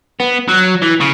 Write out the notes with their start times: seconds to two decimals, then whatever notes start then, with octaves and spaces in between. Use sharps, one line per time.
0.20 B3
0.49 F#3
0.82 E3
1.00 C#3